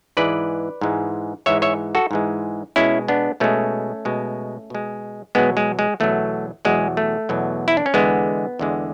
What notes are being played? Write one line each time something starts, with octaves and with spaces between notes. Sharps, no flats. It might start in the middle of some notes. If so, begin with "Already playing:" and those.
G#2 E3 G#3 B4 D5
G#2 E3 G#3
G#2 E3 G#3 C#5 E5
C#5 E5
F#4 A4
G#2 E3 G#3
B2 G#3 C#4 E4
B3 D4
B2 G#3 A3 C#4
B2 G#3
B2 G#3
E2 B2 F#3 G#3 B3
G#3
G#3
E2 B2 F#3 A3
E2 B2 F#3 G#3
A3
E2 B2 F#3
E4
D4
C#4
E2 D3 G#3 B3
E2 D3 G#3